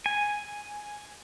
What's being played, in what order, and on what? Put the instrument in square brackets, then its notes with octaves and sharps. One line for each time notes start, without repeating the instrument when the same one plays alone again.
[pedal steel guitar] G#5